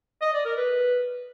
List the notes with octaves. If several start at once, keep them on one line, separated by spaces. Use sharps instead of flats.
D#5
D5
A#4
B4